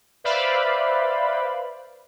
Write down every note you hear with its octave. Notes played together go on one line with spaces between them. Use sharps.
B4 C5 D5 E5 F5 B5